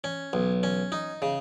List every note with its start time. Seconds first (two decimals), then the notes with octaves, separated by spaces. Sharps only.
0.04 C#4
0.33 B1
0.63 C#4
0.92 D#4
1.22 C#3